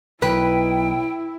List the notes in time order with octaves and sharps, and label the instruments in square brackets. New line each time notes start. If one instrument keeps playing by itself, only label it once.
[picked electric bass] B1 [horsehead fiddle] E4 [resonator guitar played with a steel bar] B4 [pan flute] G5